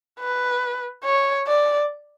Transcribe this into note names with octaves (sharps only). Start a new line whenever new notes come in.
B4
C#5
D5